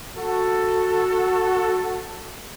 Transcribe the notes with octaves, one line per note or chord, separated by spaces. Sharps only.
F#4 A4